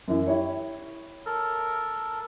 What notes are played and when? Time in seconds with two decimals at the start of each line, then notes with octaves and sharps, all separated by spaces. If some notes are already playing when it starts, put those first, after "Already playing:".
0.08 F#2 E3
0.27 E4 G4 C#5
1.26 A4 A#4